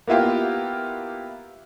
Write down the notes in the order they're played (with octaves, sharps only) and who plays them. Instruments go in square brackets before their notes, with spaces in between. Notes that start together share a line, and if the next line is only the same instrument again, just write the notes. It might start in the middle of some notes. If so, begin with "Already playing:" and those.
[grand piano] A#3 B3 E4 F4 G4